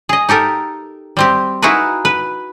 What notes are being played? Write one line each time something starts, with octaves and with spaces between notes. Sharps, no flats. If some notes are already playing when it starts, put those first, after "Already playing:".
G#4 D#5
D#4 G4 A4 A#4
G3 C4 G4
D#4 E4 F#4 G#4 A#4 B4
B4